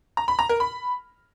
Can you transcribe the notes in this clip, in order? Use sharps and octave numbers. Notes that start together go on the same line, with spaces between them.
A#5
B5
A#5
A#4
B5